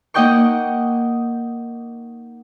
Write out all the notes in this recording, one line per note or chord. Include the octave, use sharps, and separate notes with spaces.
A#3 D#4 D#5 F#5 G5 C#6